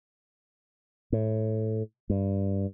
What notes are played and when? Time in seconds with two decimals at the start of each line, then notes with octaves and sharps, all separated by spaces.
1.12 A2
2.10 G2